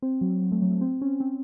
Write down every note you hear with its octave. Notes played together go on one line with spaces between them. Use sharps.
C4
F#3
F#3
A3
F#3
A3
C4
C#4
C4